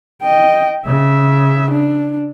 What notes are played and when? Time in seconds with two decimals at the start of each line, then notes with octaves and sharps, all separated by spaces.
0.22 D#5 G5
0.86 C#3 E5
1.71 D4